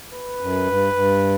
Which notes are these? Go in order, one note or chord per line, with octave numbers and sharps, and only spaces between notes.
B4
F#2
G2
G2